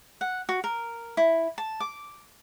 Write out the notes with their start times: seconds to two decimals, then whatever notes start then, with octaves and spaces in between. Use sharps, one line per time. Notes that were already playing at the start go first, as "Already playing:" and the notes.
0.21 F#5
0.49 F#4
0.64 A#4
1.17 E4
1.58 A5
1.80 D6